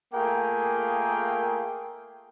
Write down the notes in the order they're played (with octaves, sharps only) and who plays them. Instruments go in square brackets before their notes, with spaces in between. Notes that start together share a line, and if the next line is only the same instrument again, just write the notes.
[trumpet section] A3 A#3 F4 G#4 A#4 G5